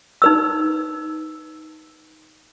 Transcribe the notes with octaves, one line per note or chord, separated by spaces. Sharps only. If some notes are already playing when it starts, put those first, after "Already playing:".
D#4 B4 E6